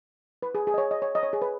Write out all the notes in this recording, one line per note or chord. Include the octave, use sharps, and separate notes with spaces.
B4
G#4
G#4
D#5
C#5
D#5
C#5
D#5
C#5
G#4
B4